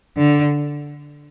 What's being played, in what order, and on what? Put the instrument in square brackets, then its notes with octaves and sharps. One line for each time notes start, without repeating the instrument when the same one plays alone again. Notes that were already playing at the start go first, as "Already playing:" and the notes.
[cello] D3